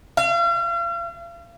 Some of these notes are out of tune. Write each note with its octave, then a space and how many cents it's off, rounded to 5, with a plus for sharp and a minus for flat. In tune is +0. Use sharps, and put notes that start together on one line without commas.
F5 -40